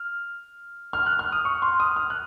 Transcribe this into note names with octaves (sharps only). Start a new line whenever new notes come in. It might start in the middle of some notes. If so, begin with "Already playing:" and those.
Already playing: F6
F6
F#6
F6
D#6
C#6
C6
D#6
F6
F#6